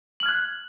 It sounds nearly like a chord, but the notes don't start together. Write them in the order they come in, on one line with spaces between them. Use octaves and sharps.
F#7 F6 G#6 F#6